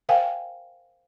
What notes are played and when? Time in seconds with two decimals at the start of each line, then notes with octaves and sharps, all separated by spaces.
0.09 A#4 C5 F5 G5 G#5